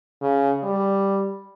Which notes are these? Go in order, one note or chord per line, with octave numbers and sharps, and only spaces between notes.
C#3
G3